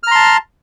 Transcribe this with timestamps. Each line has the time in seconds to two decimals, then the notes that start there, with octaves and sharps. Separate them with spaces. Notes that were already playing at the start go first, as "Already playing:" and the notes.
0.03 F6
0.07 A#5
0.11 C6
0.15 A5